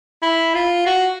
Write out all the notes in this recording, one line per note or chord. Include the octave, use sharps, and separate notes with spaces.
E4
F4
F#4